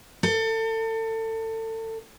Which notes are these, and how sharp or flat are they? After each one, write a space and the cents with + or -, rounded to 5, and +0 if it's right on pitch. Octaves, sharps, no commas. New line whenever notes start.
A4 +30